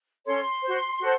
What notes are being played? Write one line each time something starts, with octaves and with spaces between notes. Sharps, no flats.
C#4 A4 C#5 C6
F#4 C5
F#4 A4 C5